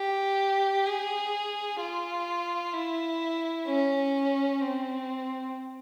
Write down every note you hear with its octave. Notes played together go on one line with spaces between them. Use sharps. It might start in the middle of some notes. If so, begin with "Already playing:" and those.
Already playing: G4
G#4
F4
E4
C#4
C4